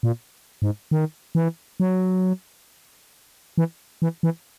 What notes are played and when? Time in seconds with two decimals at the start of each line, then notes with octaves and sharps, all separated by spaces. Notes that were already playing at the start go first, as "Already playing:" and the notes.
0.03 A#2
0.62 G#2
0.91 D#3
1.35 E3
1.80 F#3
3.58 E3
4.02 E3
4.23 E3